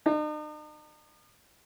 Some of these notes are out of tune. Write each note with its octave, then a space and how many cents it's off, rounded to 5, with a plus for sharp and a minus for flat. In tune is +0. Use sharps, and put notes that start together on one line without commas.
D#4 -45